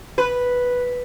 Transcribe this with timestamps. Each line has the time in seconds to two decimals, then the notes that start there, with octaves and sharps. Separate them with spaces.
0.18 B4